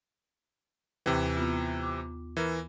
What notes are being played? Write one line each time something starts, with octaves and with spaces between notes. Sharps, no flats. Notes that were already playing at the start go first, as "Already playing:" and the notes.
D#2 C3 E3
B3 F4
D6
E3 A#4